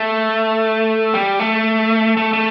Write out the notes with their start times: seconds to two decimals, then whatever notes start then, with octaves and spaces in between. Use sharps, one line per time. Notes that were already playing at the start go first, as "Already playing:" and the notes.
Already playing: A3
1.14 G3
1.40 A3
2.17 A3
2.33 A3